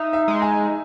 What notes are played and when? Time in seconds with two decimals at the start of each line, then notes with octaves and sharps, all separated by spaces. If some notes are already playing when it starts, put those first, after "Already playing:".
Already playing: D#4 E5
0.13 E5
0.28 G#3
0.42 G#5